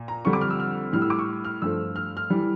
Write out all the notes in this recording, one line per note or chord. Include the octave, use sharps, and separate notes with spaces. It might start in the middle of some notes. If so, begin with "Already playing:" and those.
Already playing: A#2
A#5
F2 D3 G3 C#6
D6
F6
E6
F6
A2 G3 F6
E6
D6
C#6
F6
G2 F3 A3 E6
F6
F6
E3 G3